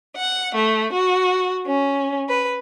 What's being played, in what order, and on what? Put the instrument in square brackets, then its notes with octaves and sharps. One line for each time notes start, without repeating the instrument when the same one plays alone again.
[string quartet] F#5
A3
F#4
C#4
B4